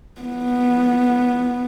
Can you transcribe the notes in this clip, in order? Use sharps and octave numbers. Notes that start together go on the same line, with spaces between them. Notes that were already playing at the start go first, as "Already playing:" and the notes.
B3